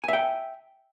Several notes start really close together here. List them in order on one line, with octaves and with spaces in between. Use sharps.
G#5 E5 G5